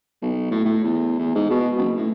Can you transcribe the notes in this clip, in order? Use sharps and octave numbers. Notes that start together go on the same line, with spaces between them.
B1
A2
A2
E2
E2
G#2
B2
F#1
A2